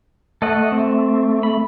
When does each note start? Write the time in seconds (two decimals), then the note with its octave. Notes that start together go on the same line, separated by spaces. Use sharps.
0.42 A3 A4 D#5 F#5
0.72 C4
1.43 B5